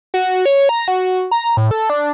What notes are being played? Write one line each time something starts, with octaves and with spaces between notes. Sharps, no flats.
F#4
C#5
A#5
F#4
A#5
A2
A4
D4